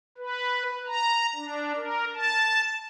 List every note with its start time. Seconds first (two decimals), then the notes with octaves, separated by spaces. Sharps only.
0.18 B4
0.87 A#5
1.35 D4
1.76 A#4
2.14 A5